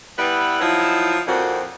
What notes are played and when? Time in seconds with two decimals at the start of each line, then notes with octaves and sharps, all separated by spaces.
0.17 G3 B3 E4 B4
0.60 F3 F#3 D#4 E4
1.27 F2 A#2 C4 F#4